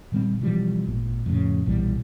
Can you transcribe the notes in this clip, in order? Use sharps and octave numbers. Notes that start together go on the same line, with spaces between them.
A#2 D#3 G3 C4
B2 E3 F3 G3
G#1 A#2
F2 A2 C#3
B1 A#2 E3 G3